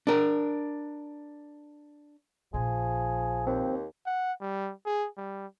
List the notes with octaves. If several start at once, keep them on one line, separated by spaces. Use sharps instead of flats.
D4 A#4
A#1 A#2 F3 G#4
D#2 C4
F#5
G3
G#4
G3